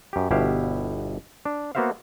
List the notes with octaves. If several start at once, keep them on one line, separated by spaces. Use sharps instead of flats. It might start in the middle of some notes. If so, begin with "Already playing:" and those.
F#2 G4
G1 B2 E4 G4 E5 F5
D4
A#3 B3 F#4 C5 E5 F5